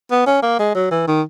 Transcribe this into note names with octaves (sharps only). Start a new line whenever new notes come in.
B3
C#4
A#3
G#3
F#3
E3
D#3